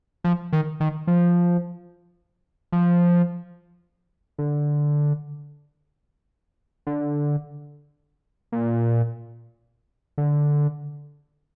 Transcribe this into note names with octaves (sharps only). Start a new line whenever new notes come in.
F3
D#3
D#3
F3
F3
D3
D3
A#2
D3